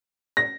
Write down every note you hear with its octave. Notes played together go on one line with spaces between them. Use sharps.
A#6